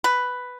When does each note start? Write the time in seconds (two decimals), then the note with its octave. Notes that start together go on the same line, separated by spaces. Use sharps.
0.04 B4